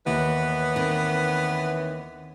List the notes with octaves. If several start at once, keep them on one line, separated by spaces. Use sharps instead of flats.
D#2 E3 B3 B4 C#5
D#3 C4